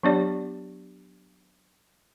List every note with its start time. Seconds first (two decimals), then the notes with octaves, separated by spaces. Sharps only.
0.03 F#3 B3 D4 G4 D5